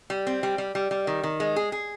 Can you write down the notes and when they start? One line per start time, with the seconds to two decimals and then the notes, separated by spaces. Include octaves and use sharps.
0.10 G3
0.27 C4
0.43 G3
0.58 G3
0.75 G3
0.91 G3
1.07 D#3
1.23 D#3
1.40 G#3
1.56 G#4
1.72 G#4